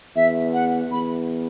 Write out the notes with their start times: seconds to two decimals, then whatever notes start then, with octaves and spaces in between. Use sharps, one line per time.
0.16 E2 E5
0.54 F#5
0.92 E2 B5